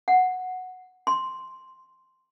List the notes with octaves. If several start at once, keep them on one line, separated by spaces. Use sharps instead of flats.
F#5
C6